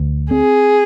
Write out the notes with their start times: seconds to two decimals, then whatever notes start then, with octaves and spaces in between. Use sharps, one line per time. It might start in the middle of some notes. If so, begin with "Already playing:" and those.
Already playing: D2
0.31 C4 G#4